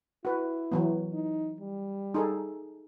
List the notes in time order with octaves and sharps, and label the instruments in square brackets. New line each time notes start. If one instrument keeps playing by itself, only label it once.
[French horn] E4 [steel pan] F#4 B4
[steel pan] E3 F#3 B3
[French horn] D#4
G3
[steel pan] D#4 G#4 A4